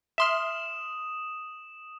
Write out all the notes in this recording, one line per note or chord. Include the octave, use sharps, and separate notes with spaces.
E5 C6 D#6 F6 E7